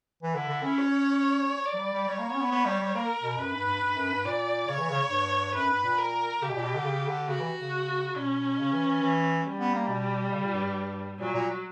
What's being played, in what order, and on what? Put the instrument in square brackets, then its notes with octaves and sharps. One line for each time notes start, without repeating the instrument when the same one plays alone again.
[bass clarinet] E3
[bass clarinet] D3 [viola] E4
[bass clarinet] D3
C#4
[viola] C#5
D5
[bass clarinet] F#3
G3
G3
[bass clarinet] G3 [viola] C#5
[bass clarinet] A#3
B3
C#4
B3
B3
G3
G3
[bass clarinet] A#3 [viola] A#4
[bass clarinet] B2
[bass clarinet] F#2 [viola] B4
[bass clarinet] G2
G2
G2
F#2
G2
[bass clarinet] A#2 [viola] D5
[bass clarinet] C#3 [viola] C#5
[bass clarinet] E3
C#3
G2
[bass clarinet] F#2 [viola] B4
[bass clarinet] G2
A#2
[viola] A#4
[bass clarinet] C#3 [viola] G4
[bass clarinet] B2
A#2
B2
D3
C#3
D3
[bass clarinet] C#3 [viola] F#4
[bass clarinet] E3
C#3
[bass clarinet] B2 [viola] C#4
[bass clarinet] C#3
E3
E3
E3
[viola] G3
[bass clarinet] B3
A#3
B2
C#3
A#2
G2
G2
[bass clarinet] A#2 [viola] F#3
[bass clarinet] A#2